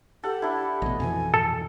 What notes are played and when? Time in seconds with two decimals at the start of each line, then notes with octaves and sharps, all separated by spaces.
0.24 G4 A4 F#5
0.42 D4 E4
0.82 A1 B2 D#5
1.00 F2 B2 E3 G#5
1.34 A4